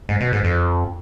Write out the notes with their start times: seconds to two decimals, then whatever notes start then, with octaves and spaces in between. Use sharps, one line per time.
0.09 G#2
0.21 B2
0.32 G#2
0.44 F2